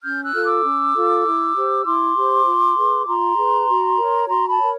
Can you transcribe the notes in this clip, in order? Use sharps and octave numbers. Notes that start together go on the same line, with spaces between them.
C#4 F6 G6
E6 F#6
F4 A4 F6
D6 E6
C#4
F4 A4
E4
G4 C5
E4 C6 D6
G4 C5
F4
G#4 B4
F4 A#5 C6
G#4 B4
F#4
A#4
C#5
F#4 A#5 C6
A5 B5
A#4 C#5